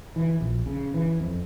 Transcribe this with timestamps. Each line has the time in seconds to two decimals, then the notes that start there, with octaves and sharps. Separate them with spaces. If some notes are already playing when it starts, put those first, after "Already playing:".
0.16 E3
0.41 A#1
0.66 C#3
0.94 E3
1.20 F2